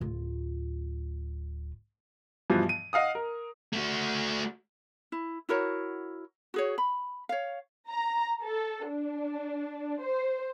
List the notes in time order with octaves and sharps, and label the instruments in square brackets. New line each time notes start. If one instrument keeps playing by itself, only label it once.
[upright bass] D1 F4
[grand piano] G2 B2 E3 F3
D#7
D#5 F5 F#5 D#6
A#4
[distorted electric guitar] A3 F#4
[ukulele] E4
E4 F#4 A#4 C#5
F#4 G#4 C#5
B5
C#5 F5
[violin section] A#5
A4
D4
C5